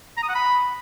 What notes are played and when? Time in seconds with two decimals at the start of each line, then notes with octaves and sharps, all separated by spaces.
0.17 A#5
0.23 D#6
0.29 F#5
0.35 B5